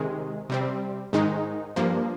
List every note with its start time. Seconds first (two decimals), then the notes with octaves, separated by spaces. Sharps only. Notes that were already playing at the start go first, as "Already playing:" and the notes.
Already playing: C3 D#3 G#3
0.50 C3 G3 C4
1.13 G#2 D#3 G#3 D#4
1.76 G2 F3 A#3